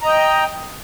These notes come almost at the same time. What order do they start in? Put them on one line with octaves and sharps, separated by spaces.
A#5 D#5 G5